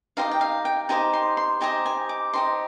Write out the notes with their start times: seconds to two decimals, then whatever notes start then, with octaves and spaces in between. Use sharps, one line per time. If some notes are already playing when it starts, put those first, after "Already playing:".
0.17 D#4 G4 C5 D#5 F5
0.31 G5
0.41 F5
0.65 G5
0.89 D#4 G4 C5 D#5 G#5
1.13 C6
1.37 C6
1.61 D#4 G4 C5 D#5 G#5
1.86 G#5
2.09 D6
2.33 D#4 G4 C5 D#5 C6